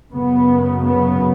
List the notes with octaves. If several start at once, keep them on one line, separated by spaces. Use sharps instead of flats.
F#2 C#3 B3
B3